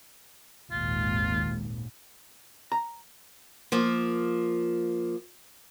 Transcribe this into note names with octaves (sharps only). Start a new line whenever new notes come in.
G#1 D#2 A#2 F4
A#5
F3 A#3